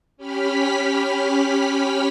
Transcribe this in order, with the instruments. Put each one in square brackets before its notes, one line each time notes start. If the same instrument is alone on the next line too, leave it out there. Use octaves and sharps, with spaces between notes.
[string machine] C#4 G4 B5 F6 B6